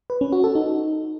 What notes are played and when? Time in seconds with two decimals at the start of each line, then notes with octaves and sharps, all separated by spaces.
0.10 B4
0.21 C#4
0.32 F#4
0.44 A4
0.55 D#4